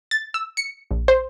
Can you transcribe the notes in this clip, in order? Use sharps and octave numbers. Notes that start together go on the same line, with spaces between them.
A6
E6
C#7
A#1
C5